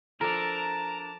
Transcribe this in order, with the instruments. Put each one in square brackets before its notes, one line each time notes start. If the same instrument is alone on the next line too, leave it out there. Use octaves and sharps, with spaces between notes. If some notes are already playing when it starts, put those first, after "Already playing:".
[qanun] F3 A4 [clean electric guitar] D4 A#4 [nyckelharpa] A5 [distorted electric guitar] A#5